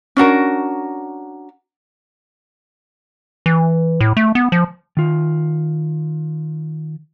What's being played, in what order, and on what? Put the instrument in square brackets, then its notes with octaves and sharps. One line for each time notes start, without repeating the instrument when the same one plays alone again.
[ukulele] C#4 D4 F#4 A#4
[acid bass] E3
A2
A3
B3
F3
[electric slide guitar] D#3 F4